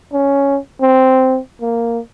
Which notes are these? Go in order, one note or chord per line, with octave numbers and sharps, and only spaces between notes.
C#4
C4
A#3